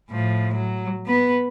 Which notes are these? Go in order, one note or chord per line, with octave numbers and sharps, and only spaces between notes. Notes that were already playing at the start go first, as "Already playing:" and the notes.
A2 F3
F#3
B3 B4